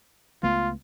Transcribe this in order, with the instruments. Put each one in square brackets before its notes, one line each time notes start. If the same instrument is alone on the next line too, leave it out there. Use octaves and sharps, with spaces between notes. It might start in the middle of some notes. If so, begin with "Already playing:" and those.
[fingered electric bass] C#2 A3 B3 [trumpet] F4